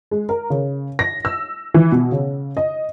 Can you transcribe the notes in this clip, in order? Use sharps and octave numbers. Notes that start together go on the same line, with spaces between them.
G#3
A#4
C#3
A#6
E6
E3
B2
C#3
D#5